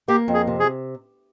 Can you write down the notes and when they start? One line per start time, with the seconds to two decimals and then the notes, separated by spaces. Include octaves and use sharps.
0.08 A#3 G4
0.28 F2
0.34 G#4
0.47 C3
0.60 G#4